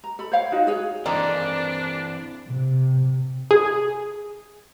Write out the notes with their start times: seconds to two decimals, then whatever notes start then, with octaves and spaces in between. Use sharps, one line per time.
0.04 A#5
0.19 A4 B5
0.32 C5 C#5 F5 G5
0.52 D#4 F4 F#4
0.67 G#4 C#5 G#5
1.06 D#3 E3 G#3 A#3 C4 D4 D5
2.49 C3
3.51 G#4